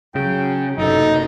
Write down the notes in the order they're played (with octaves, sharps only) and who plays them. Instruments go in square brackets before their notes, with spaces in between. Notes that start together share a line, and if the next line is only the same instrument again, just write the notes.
[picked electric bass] C#3 [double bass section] F#3 [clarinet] G5
[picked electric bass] F#1 [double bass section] A2 C3 [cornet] D#4 [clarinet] A4